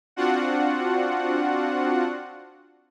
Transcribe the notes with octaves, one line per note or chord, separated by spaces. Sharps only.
C4 D4 F4 F#4 F#5